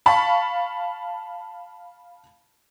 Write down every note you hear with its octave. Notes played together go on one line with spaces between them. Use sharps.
F5 A5 B5 C#6